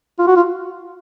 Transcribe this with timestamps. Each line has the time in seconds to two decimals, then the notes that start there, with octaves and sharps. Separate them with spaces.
0.19 F4
0.27 F#4
0.36 F4